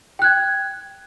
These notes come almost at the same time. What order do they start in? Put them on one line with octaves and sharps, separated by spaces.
G5 F#6 G#6